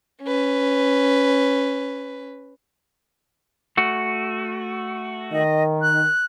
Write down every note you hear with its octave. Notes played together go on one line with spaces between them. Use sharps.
C#4 B4
A3 F#4
D#3 D#5
F#6